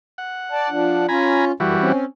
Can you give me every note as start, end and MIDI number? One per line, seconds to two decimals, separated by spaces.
0.18 1.07 78
0.52 0.69 74
0.52 0.69 81
0.70 1.06 53
0.70 1.06 62
1.09 1.52 61
1.09 1.52 65
1.09 1.45 80
1.09 1.45 82
1.09 1.45 83
1.60 1.75 42
1.60 1.92 52
1.60 1.92 55
1.60 1.92 66
1.80 2.05 60
1.80 2.05 61